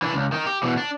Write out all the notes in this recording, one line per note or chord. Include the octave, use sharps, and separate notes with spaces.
E3 D4
C#2
D#3 D#4
G4
B2 E3
D4